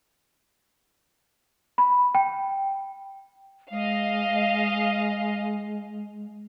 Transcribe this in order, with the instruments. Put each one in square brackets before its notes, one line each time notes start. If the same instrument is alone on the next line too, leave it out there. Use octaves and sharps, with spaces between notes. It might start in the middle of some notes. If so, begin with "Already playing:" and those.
[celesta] B5
G5
[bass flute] G#3 [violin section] D#5 F5